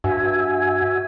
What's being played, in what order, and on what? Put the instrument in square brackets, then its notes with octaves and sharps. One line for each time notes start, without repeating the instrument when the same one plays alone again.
[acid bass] G2 [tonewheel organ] F#4 E5 G#5